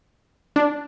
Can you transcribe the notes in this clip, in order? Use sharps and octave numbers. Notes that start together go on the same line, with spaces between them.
D4